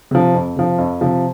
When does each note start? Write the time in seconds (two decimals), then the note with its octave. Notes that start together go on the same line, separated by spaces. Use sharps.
0.11 C3 F3
0.34 F2
0.56 C3 F3
0.78 F2
1.01 C3 F3